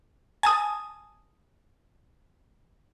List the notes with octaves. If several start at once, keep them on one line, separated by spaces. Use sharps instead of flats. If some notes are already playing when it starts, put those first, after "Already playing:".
G#5 A5 D#6